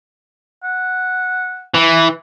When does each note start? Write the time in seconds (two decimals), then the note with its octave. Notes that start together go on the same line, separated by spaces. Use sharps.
0.64 F#5
1.75 E3